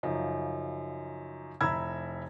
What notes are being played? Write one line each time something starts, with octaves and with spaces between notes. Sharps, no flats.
F#2 C#3 F3 D#4
F1 E4 A#5 B5 E6 G#6